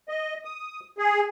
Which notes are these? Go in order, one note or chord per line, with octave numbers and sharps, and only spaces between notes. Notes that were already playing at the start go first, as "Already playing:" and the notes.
D#5
D#6
G#4